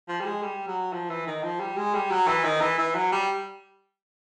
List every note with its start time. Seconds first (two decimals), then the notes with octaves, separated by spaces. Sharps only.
0.08 F3
0.21 G3
0.26 G#3
0.43 G3
0.68 F#3
0.93 F3
1.10 E3
1.27 D#3
1.43 F3
1.61 G3
1.77 G#3
1.94 G3
2.11 F#3
2.28 E3
2.44 D#3
2.61 E3
2.79 E3
2.96 F#3
3.12 G3